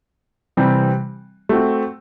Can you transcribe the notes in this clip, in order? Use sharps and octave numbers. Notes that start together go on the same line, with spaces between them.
C3 E3 G3 C4
A3 C4 F#4